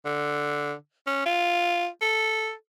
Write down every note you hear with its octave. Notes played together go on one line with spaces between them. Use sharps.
D3
C#4
F4
A4